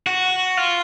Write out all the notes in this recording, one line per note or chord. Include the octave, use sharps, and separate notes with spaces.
F#4
F4